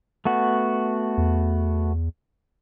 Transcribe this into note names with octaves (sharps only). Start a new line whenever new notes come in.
A3 B3 F#4
E2